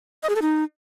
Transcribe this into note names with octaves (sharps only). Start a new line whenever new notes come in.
D#5
G#4
A4
D#4